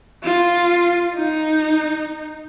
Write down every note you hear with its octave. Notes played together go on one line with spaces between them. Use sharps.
F4
D#4